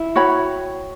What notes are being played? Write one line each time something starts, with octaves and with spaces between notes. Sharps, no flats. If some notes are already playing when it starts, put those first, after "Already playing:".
Already playing: E4
F#4 C#5 G5 B5